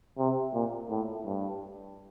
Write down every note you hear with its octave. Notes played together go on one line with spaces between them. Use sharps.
C3
A#2
A2
G2